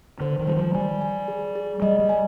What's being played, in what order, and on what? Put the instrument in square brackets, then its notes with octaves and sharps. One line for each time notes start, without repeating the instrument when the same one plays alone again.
[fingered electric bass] D3 [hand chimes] C5
[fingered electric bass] D#3
[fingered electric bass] G3 [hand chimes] C5
[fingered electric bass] F3
[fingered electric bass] G3 [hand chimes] G#5
[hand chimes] G#5
G#4
G#4
[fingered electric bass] G3 [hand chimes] D#5
[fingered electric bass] G3
[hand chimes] G#5